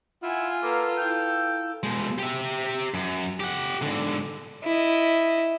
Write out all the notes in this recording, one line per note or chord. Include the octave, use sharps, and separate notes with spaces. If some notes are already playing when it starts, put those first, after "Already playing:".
E4 F4 F#5 G#5
A#3 A4 B4 A#5 B5
E4 F5 G5
B2 G#3
G4 E5
F#2
G4 F#5
G#2 D3
E4 D#5